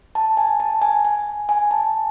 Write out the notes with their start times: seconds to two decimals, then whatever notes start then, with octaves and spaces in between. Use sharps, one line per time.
0.15 A5
0.37 G#5
0.60 A5
0.82 G#5
1.05 G#5
1.49 G#5
1.71 A5